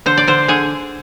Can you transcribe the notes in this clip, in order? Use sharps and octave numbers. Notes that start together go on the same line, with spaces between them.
D3 C5
D5
D3 C5
D3 G#4